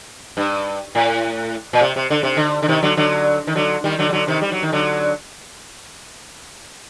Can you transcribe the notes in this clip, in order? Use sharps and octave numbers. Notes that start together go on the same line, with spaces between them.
G2
A2
A#2
C3
C3
D3
C3
D3
D3
C3 D#3
D3 F#3
D3 F#3
D#3
D3 F#3
D#3 G3
D3 F#3
G3
D3 F#3
C3 D#3
G3
F#3
D#3
D3 F#3